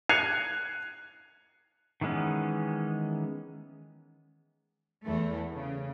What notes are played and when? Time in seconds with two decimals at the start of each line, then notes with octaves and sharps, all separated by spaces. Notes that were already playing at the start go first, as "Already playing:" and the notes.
0.09 F#6 G#6 C7 C#7 D#7 F7
2.01 D#3 E3 G#3 B3 C#4
5.06 E2 E3 A3
5.52 C#3